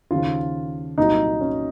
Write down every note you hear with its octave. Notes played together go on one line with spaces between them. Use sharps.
D#2 C#3 F3 F4
C2 A#2 F#3 A#3 D#4
C#4